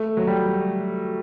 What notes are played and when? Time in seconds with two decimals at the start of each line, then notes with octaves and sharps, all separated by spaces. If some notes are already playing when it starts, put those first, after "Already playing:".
Already playing: A3
0.17 F#3
0.27 G3